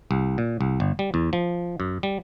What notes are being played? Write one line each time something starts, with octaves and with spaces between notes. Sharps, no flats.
C2
A#2
C2
G1
G3
E2
F3
F#2
G3